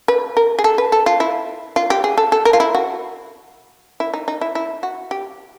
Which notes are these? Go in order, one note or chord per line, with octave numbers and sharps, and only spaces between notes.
B4
A#4
G#4
A4
B4
A4
F4
E4
F4
G4
G#4
A4
A4
A#4
F4
E4
F#4
E4
D#4
D#4
E4
E4
F#4
G4